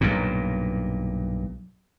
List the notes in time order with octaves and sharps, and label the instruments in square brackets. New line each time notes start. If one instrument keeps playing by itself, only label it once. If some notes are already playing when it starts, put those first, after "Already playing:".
[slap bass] B1 G2 A#2